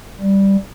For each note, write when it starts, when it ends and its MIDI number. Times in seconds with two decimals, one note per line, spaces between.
0.21 0.56 55